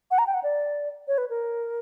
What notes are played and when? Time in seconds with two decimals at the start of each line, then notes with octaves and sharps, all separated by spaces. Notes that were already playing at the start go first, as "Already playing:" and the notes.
0.11 F#5
0.18 A#5
0.27 G5
0.34 F#5
0.43 D5
1.08 C#5
1.18 B4
1.30 A#4